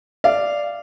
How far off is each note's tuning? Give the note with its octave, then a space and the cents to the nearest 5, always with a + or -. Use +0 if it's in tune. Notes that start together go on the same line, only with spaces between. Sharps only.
D5 +0 F5 -15